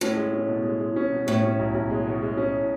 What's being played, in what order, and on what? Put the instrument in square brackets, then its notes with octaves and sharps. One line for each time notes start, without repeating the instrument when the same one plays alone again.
[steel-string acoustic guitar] A2 [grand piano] C#4
[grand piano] G#3
C#4
B2
G#3
G#3
C#4
B2
[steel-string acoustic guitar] A2 [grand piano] C#4
[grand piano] C#4
B1
B1
G#3
B2
G#3
C#4